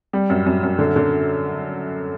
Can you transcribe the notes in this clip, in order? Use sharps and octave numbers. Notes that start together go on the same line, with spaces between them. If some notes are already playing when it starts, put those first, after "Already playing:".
G3
F#2
F#2
F#2
D3
D3